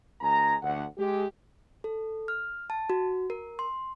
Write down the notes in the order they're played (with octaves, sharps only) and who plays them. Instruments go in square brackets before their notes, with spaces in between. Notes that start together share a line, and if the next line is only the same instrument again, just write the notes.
[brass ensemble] C#2 G#3 G#5 A#5
D2 F#5
G#3 G4
[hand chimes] A4
F6
A5
F#4
A#4
C6